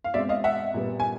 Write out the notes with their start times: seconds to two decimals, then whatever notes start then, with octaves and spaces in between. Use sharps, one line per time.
0.04 F5
0.14 B2 G#3 C4 D5 E5
0.29 D#5 F5
0.44 E5 F#5
0.74 A#2 G3 B3
1.00 G#5